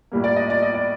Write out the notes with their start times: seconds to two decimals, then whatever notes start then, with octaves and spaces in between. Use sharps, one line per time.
0.12 A2 G3 A#3
0.24 D5
0.36 D#5
0.50 D5
0.62 D#5
0.74 D5